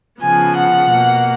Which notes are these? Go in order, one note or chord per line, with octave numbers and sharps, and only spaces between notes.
C#3 F3 B3 G#5
F#5
B2 A#3